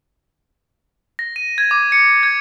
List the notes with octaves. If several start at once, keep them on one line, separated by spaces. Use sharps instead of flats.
A#6
D#7
G#6
D6
C#7
G#6